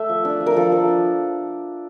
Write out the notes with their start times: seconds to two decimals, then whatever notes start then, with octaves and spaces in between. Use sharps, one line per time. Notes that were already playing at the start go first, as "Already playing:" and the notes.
Already playing: A3 E5
0.09 F3
0.25 D4
0.40 F3
0.46 A#4
0.56 F3 A4
0.72 F3 A4
0.88 D4